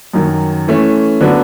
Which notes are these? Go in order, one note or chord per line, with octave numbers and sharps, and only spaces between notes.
F#2 D#3 F#3
E3 A3 C#4
D3 F#3 B3 D4